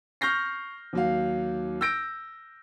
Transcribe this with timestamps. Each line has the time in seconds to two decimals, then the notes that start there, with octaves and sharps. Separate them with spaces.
0.21 C#6 F6 G6 A#6 C7
0.93 D#2 F#3 F5
1.81 E6 G6 A#6 D7